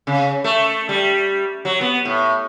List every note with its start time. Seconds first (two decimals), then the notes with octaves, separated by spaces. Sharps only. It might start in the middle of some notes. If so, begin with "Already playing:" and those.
0.07 C#3
0.44 A3
0.89 G3
1.65 F#3
1.81 B3
2.05 A2